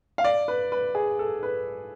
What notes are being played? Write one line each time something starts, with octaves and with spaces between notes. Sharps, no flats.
F5
D5
B4
B4
G#4
A4
B4